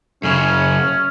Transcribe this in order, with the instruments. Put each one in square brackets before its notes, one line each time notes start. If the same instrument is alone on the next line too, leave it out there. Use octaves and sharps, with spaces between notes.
[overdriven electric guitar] F#2 C#3 [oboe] C#4